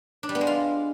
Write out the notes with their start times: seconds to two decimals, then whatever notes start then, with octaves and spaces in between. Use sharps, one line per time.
0.23 D4
0.29 G3
0.35 B3
0.41 G#3
0.47 F4